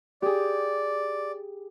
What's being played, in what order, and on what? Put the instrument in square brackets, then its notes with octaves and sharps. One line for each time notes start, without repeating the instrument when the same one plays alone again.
[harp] G4 G#4 [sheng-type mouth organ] D5